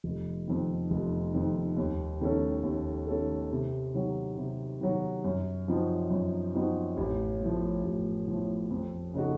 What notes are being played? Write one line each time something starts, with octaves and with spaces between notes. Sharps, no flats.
F1
F2 D#3
F1
F2 D#3
D#2
D#3 A3 C#4 A4
D#2
D#3 A3 C#4 A4
C3
D#3 F#3
C3
D#3 F#3
F#2
F3 C4 D#4 F#4
F#2
F3 C4 D#4 F#4
A1
A2 F3
A1
A2 F3
F2
C#3 A3 D#4 F#4